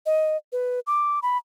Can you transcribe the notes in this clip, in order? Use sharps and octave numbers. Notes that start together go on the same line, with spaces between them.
D#5
B4
D6
B5